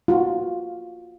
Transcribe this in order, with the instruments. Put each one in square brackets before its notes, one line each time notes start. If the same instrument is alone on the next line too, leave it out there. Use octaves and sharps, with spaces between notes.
[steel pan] F4 F#4